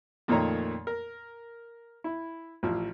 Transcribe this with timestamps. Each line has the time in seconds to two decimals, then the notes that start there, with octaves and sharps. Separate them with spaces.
0.28 F2 A#2 D#3 A3 C#5 A#5
0.87 A#4
2.04 E4
2.63 A1 F3